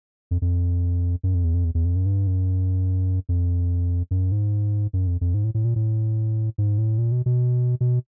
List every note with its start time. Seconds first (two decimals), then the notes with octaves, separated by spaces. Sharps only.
0.31 F2
0.42 F2
1.23 F#2
1.34 F2
1.44 E2
1.54 F2
1.64 E2
1.75 E2
1.85 F2
1.96 F#2
2.06 G2
2.27 F#2
3.29 F2
4.11 F#2
4.32 G#2
4.93 F#2
5.07 F2
5.21 F2
5.34 G#2
5.44 A2
5.54 A2
5.65 A#2
5.76 A2
6.58 G#2
6.78 A2
6.98 A#2
7.12 B2
7.26 B2
7.81 B2